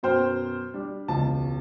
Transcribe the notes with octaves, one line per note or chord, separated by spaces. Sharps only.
F#2 B2 C5 G5 F6
G3 D4
E1 C#2 A5